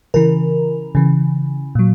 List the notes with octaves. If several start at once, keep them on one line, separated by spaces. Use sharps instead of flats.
C#3 E3 A#4
C#3 E3
A#2 F#3